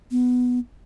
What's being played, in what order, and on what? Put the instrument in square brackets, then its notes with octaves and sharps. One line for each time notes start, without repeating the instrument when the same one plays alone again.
[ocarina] B3